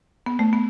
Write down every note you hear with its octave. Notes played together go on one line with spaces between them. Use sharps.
B3
A3
B3